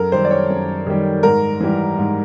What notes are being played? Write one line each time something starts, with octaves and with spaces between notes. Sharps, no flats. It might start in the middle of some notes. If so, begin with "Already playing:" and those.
Already playing: F#2 A4 A#4
D#3 G3 C5
D5
C#5
F#2
D#3 G3
G#2 A#4
E3 G3
G#2